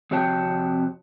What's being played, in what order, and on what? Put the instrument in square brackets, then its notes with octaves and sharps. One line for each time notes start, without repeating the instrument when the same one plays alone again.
[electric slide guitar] F2 C3 F#4 C#5 G5 A5